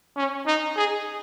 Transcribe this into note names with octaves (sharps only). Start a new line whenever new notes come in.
C#4
D#4
G#4